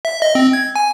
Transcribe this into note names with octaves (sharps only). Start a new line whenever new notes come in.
E5
D#5
C4
G#6
G#5